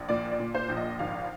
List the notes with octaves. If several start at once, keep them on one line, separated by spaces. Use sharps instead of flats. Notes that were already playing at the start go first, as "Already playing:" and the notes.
Already playing: A#1
A#2 D5
D5
A#2
C5
A#1
D#5
G#1 F5